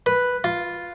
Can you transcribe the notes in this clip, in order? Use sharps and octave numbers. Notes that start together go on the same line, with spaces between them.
B4
F4